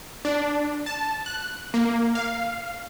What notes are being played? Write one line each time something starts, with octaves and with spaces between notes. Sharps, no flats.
D4
A5
F#6
A#3
F5